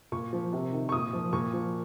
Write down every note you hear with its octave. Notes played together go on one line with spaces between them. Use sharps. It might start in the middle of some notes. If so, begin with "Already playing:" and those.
A#2 C#6
F3
C3
D#3
C#6
A#2 D#6
F3
A#2 C#6
F3